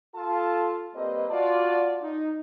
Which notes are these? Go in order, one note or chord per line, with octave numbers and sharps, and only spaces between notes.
F4 A4 A5
G3 A#3 C4 G4 B4 D#5
F4 F#4 D5 A5
D#4